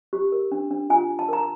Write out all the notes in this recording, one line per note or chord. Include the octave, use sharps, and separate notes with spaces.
G4
A#4
D4
D4
F4 G#5
F4
A5
A#4 A#5